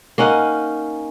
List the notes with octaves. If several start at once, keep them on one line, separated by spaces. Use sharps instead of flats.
A#3 C#4 D#4 F#5